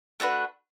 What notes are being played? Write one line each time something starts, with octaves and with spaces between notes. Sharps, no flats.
A3 D4 F#4 B4